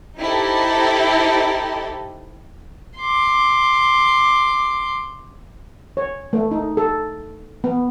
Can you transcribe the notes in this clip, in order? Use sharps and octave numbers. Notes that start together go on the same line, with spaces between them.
D#4 E4 G4 A4 C5
C6 D6
C#5
A3
D#4
A4
B3